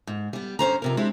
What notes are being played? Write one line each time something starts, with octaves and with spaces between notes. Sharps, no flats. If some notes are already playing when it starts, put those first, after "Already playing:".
G#2
G3 B3
G2 C#4 C5 A#5
F2 C3 A#4
G#3 C4 D4 E4 G4